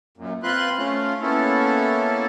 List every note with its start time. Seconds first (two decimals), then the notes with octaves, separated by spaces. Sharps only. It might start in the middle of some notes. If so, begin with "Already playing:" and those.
0.18 F#2 A#2
0.43 C4 F4 B4 C6 F#6
0.78 A3 C#4 F4
1.21 A#3 B3 C#4 E4 A4